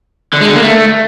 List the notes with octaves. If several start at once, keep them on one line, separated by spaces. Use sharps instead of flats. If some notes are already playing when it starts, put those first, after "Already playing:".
D3
G#3
D3
A#3
A3